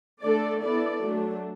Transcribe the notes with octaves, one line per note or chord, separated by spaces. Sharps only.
D3 A3 D4 A4 D5
B3 E4 A4 D5
F#3 A3 D4